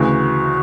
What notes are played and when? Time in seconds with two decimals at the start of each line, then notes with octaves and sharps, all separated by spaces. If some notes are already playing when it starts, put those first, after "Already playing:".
Already playing: D2 C#3 E3 F#4